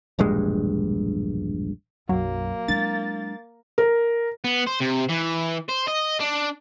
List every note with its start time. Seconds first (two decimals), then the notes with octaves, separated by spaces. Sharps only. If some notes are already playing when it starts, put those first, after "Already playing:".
0.19 E1 A#1 G2 G#3
2.09 B1 F#2 F#3 A#3
2.68 F#3 G#3 D4 E4 A6
3.78 A#4
4.44 B3
4.67 C5
4.81 C3
5.09 E3
5.69 C5
5.87 D#5
6.20 D4